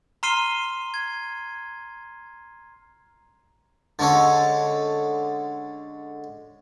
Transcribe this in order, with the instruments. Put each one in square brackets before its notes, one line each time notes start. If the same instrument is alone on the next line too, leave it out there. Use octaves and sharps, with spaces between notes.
[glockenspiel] A#5 C6 F6 C7 D#7 G7
G#6
[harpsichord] D3 G#3 C#4 A4